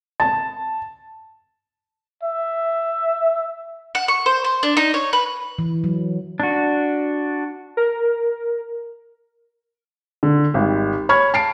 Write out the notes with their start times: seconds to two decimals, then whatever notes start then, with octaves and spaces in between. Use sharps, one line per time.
0.20 A5
2.23 E5
3.95 F#5
4.08 C#6
4.26 C5
4.44 C5
4.63 D4
4.77 D#4
4.94 C#5
5.13 B4
5.59 E3
5.84 F#3
6.40 D4 F#4
7.77 A#4
10.23 D3
10.54 G#1 G3
11.09 C#5 B5 C#6 F6 G#6
11.34 A5 C7 D7